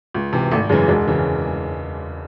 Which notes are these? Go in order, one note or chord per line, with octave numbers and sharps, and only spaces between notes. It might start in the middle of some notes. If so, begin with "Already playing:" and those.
C#2
C3 E3
G#1 A3
F#2 C#3 E3 G#3
E1 G#3
C#3 E3